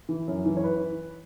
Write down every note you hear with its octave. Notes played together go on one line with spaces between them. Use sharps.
E3
F#2
E3
C#5
B4